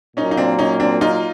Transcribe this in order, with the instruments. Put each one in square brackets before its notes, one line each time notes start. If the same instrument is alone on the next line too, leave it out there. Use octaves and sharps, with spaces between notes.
[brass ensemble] A#2 F#3 A#3 [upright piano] C#4 D#4
[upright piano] D#4
C4 D4
C#4 D#4
C4 D4
D#4 F4